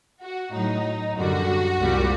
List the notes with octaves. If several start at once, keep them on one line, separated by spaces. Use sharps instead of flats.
F#4
A2 F#3 D#4
F#2 D3 G3 F#4
C2 A#2 G3